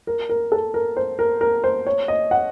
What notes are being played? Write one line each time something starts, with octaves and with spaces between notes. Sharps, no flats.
A#4
A#4
A4
A#4
C5
A#4
A#4
C5
C#5
D#5
F#5